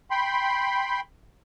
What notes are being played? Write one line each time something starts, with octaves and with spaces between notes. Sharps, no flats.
G5 B5 C6